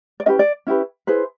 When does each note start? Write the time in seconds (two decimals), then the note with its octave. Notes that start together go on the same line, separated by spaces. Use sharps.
0.20 D5
0.26 C#4 E4 G4 B4 D#5
0.39 D5
0.67 C#4 E4 G4 B4
1.07 E4 G#4 B4 C5